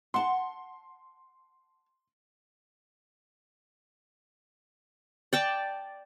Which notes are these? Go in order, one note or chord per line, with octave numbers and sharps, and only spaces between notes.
F#5 A5 C6
D5 G5 A5